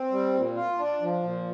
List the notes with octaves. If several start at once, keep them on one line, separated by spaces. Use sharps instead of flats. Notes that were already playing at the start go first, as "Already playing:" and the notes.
Already playing: C4
G3
A#2
F4
D4
F3
A#2